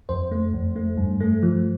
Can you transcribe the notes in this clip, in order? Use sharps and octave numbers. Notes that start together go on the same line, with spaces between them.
F2 C5
A3
F2
A3
G2
A3
F3